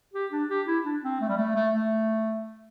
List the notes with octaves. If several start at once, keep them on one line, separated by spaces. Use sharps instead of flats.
G4
D4
G4
E4
D4
C4
A3
G3
A3
A3
A3